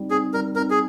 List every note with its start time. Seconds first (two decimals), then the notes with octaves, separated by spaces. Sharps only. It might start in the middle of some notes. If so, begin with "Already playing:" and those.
Already playing: G3 C4 D#4
0.10 C4 D#4 G#4
0.33 G3 A#4
0.56 C4 D#4 A#4
0.70 G#4